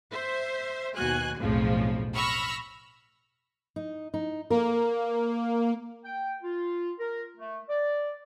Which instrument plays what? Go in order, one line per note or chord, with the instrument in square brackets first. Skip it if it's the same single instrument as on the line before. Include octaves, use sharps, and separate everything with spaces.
[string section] C5 E5
D#2 B2 F#4 G#5 F#6
B1 F2 A2 C#3 F3
B5 C#6 E6 F6 A#6 B6
[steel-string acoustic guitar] D#4
D#4
[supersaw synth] A#3 [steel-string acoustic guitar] A#4
[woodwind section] G5
F4
A#4
A3
D5